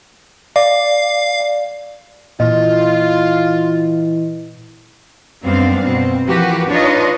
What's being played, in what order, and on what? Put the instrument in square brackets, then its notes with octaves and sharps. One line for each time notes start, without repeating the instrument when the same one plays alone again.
[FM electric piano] D5 [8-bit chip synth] F5
[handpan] A#2 [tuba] E3 [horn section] F4 [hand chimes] D#5
[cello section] F#2 G3 B3 C4 D4 F5
B2 C4
E3 F3 A#3 F#4 G4 B4
D4 D#4 F4 B4 C#5 D#5